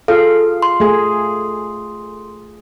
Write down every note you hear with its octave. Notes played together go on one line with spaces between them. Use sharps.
F4 G#4 A4 F5
C6
A3 G#4